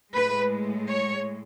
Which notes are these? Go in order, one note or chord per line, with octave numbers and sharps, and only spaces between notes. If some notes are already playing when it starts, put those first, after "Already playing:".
A2 G#3 B4
C#5